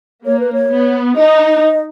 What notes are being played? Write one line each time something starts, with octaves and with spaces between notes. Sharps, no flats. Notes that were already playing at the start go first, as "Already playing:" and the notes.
A#3 C#5
B4
C#5
B3
D#4 D#5